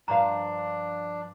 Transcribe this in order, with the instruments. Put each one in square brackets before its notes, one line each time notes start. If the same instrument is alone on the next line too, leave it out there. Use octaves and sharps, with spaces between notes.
[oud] G2 F3 F5 [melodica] D4 [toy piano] A#5 C6